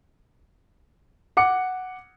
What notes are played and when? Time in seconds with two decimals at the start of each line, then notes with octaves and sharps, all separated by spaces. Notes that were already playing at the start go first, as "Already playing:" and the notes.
1.37 F#5 D6 C#7